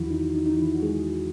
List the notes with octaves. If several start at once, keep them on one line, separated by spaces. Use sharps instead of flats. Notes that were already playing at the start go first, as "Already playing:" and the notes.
Already playing: E2 D#3 E3 F#3 E4 F#4
D#4
D#4
D#4
E3 E4
F#4
G#3 G#4